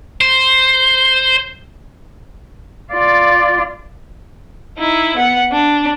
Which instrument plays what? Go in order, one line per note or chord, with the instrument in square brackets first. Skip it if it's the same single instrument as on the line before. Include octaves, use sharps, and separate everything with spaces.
[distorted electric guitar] C5
[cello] F4 D5
[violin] D#4 E4
B3 F#5
D4